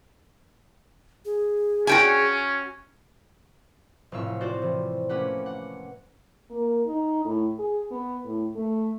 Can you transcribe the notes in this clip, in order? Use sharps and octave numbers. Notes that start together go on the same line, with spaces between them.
G#4
C#4 F#4 G5 G#5
F1 A2 F5 C#6 E6
F4 F#4 C5 D5
C3 E3 F3
A3 A#3 C#4 G4 B4 F#5
F#5
A#3
D#4
A2
G#4
B3
A2
A3